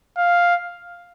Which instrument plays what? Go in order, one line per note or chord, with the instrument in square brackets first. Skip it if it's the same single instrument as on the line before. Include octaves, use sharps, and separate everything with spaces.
[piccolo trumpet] F5